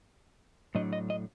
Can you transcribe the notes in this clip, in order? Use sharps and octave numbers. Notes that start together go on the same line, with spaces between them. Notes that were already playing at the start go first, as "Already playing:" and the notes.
A2 F#3 A3 D4 D#5
D#5
D#5